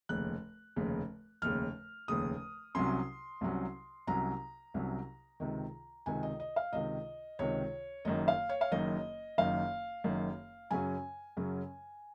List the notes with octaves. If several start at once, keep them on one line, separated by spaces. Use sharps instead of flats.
F1 D#2 C#3 F#6
F1 D#2 C#3
F1 D#2 C#3 F6
F1 D#2 C#3 D#6
C2 C3 F#3 C#4 C6
C2 C3 F#3 C#4
C2 C3 F#3 C#4 A#5
C2 C3 F#3 C#4
C#2 C3 D#3
C#2 C3 D#3 G#5
D#5
D#5
F5
C#2 C3 D#3 D#5
C#2 C3 D#3 C#5
F#1 F#2 D#3 D#5
F5
C#5
F5
F#1 F#2 D#3 D#5
F#1 F#2 D#3 F5
F#1 F#2 D#3
F#2 C#3 F#3 C#4 G#5
F#2 C#3 F#3 C#4